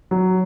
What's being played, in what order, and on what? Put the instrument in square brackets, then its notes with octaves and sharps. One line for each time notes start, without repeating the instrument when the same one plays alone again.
[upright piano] F#3